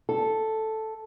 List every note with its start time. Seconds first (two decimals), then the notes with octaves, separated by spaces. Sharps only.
0.09 A4